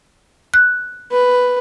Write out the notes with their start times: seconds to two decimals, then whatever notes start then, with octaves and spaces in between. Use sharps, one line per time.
0.54 F#6
1.12 B4